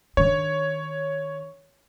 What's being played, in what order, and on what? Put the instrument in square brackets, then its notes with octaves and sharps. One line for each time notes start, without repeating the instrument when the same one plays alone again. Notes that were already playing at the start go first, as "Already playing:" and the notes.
[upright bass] D#3 D4 [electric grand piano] C#5